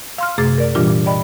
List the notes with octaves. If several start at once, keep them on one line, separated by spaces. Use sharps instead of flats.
F5 C6 F6
F#2 C3 A3 G#4 D6 A6
A#4 D5
A#2 E3 G3 D4 F4 G4
A#2
D5 D#5 G5 B5